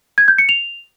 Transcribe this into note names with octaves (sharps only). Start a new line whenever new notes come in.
G#6
G6
C#7
F7